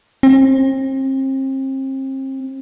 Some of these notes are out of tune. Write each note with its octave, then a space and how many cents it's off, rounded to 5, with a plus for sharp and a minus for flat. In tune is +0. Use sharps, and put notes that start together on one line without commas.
C4 +35